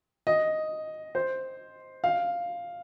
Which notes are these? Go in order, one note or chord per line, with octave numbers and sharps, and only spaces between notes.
D#5
C5
F5